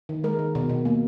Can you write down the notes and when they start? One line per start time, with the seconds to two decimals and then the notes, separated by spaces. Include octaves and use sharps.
0.09 D#3
0.23 G#3 A#4
0.39 D#3
0.55 B2
0.69 B2
0.85 A#3